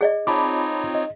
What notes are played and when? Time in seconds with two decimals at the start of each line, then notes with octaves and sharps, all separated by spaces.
0.01 G#4 D5 D#5
0.27 C4 D#4 F4 C#5 A5 B5 D6
0.95 D#5